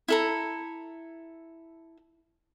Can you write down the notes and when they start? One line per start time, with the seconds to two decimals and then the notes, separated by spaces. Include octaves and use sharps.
0.08 E4 A4 A#5